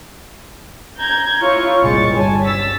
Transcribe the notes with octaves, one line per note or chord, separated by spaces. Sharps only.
A#5 G6 G#6
E4 F4 C#5 C#6
G1 C2 A#2 G#3 C#6 A6
G1 G3 C#5 G#5 A5
E6 A6 B6